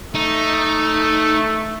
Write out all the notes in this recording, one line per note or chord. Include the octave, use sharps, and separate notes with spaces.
A3 D#4